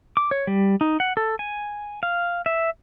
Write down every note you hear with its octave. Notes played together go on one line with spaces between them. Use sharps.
D6
C#5
G3
D#4
F#5
A4
G#5
F5
E5